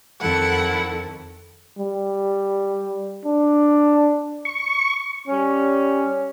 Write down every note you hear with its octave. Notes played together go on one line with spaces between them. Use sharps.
F2 D#3 E4 A4 F#5
G3
D4
C#6
G3 C#4